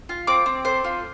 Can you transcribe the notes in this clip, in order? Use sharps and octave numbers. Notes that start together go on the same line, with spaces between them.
F4
C4 D6
C4
A4 C5
F4